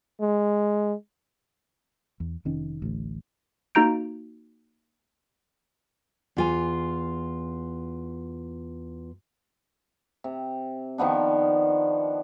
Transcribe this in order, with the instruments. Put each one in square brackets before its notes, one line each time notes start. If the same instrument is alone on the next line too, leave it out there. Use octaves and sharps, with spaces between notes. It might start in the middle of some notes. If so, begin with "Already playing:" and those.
[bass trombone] G#3
[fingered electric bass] E2
F1 D#3 C#4
A1 D2
[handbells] A#3 D#4 F#4 A#5 G6 D7
[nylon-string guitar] E2 F4 G#5
[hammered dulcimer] C3
D#3 F3 B3 D4